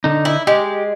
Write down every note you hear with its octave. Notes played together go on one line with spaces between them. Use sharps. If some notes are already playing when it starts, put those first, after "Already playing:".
D3 D#4
E4
G#3 G4